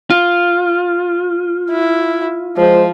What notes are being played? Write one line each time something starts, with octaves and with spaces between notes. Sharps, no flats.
F4
E4
F3 G#3 C5